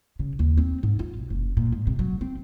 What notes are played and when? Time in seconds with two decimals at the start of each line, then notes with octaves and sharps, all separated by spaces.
0.19 C#3
0.39 D#2
0.57 C4
0.83 G#2
0.99 F4
1.17 B1
1.30 F#1
1.57 A#2
1.72 G#2
1.87 C3
1.99 F#3
2.21 C4